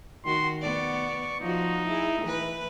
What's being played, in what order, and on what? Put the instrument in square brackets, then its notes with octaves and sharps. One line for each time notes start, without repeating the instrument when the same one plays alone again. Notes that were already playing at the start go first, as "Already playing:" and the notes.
[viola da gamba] D#3 F#4 [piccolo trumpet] C6
[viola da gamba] B3 D5 [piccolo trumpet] C#6
[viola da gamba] F3 F#4 [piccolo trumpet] D#4
[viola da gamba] E4 G#4
E3 B4